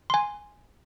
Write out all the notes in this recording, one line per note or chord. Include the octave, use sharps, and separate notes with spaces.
G#5 C6